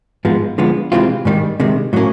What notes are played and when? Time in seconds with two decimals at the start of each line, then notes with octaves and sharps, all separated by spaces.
0.25 G#2 F3 G#3 B3
0.58 D3 F3 G#3 B3
0.92 C3 E3 G#3 C4 F4
1.25 G#2 D#3 G3
1.60 C3 D#3 G#3
1.93 A2 F#3 A#3 C#4